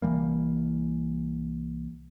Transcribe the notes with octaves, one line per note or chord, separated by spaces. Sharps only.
C2 E3 G3 A#3